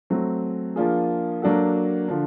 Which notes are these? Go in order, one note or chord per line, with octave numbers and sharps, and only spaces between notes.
F#3 A3 C4
F3 A#3 D4 F4 G#4
F#3 A#3 D4 F#4 A4
D3 F3